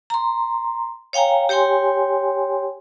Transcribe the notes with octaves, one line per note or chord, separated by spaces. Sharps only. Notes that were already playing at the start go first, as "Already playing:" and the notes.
A#5 C6
C#5 F5 G5 G#5 A#5
G4 C#5 G5 G#5 C6